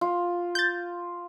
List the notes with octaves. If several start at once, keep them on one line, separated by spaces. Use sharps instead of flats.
F4
G6 A6